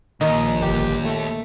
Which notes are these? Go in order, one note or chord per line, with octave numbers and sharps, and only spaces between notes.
A#1 D#2 A#2 D#3 D#5
G1 G4
A3